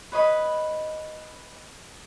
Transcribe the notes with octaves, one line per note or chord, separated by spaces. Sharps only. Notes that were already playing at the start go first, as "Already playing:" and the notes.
B4 C#5 D#5 B5